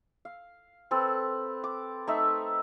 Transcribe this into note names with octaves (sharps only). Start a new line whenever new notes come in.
F5
C4 A4 B4
D6
A3 D#4 E5